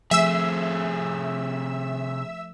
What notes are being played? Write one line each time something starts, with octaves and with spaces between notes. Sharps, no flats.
C3 F3 A3 G#4 E5 E6